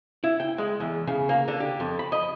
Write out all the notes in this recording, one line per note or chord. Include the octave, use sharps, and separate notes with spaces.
E4
G5
G#3
E2
C#3
A#3
D3
G4
F2
B5
D#5